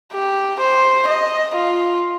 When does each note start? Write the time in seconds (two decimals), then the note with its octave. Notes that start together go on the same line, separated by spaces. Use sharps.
0.13 G4
0.60 C5
1.08 D#5
1.55 F4